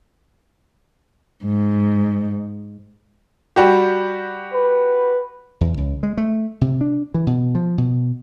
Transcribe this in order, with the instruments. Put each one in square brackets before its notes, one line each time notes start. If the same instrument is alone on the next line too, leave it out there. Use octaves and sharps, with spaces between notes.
[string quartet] G#2
[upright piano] G3 F#4 G4
[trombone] B4
[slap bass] E2
C#2
G#3
A3
C3
D4
E3
B2
F3
B2